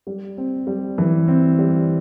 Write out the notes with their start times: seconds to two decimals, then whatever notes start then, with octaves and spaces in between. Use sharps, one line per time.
0.07 G3
0.38 C4
0.67 G3
0.98 E3
1.28 C4
1.59 G3